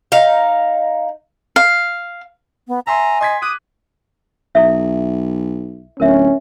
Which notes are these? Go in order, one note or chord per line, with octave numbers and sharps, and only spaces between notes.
D#4 F5
F5
B3
E5 G#5 A#5 C6
D#5 C6 G#6 B6
D6 D#6 F#6 D#7
B1 E4 A4 E5
D1 C#4 A#4 E5